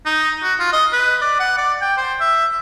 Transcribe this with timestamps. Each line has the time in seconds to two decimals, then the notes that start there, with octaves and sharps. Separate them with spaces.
0.05 D#4
0.43 F#4
0.60 F4
0.73 D#5
0.92 B4
1.21 D5
1.40 F#5
1.58 D5
1.81 G5
1.97 C5
2.20 E5